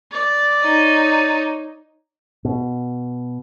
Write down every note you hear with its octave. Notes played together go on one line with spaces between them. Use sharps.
D5
D#4 C#5
B2